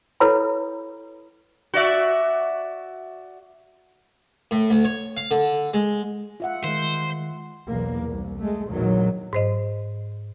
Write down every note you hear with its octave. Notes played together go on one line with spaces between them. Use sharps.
E4 A4 B4 C#5 A#5 B5
F#4 D5 E5
A2
D2
C#5
F5
D3
G#3
F4 E5 F#5
D#3 G#3 C5
B1 E2 A#3
C2
G#3 A3
A#1 E2 D#3 F#3
G#2 C5 D#5